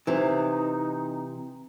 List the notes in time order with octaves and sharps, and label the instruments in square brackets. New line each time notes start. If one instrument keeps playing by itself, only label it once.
[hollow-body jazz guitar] C3 E3 [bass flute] D#4